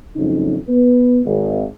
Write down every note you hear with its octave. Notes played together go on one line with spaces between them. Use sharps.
F#1 F2 G#2 C#3 F#3 D#4
B3 B4
G#1